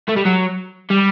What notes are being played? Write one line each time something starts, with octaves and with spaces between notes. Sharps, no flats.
A3
G3
F#3
G3